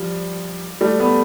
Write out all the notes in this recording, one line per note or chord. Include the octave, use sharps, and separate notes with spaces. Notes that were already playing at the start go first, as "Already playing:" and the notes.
Already playing: F3 G3
G3 A3
A3 B3